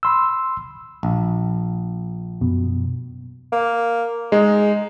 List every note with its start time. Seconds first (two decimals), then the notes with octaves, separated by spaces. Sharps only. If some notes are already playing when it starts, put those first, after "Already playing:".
0.03 B5 C6 E6
1.03 A#1
2.41 F#2 B2
3.52 A#3
4.32 G#3 D#4